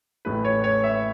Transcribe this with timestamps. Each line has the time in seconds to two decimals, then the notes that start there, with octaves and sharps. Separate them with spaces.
0.25 A1 A2 E3 A3 B4
0.45 C#5
0.64 C#5
0.84 E5